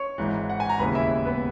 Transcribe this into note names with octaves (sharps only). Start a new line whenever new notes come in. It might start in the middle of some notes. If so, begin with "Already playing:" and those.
Already playing: C#5 C#6
G#1 G#2 E3
F#5
G#5
A#5
E1 D#2 C#3 E3 B4 B5
E4 E5
B3 B4